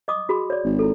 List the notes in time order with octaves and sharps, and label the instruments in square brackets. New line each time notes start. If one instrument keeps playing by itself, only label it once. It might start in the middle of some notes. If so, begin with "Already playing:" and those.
[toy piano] D#5 D6 D#6
F#4 G#4 B5
C#5 D5
[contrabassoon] G#1
[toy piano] E4 A4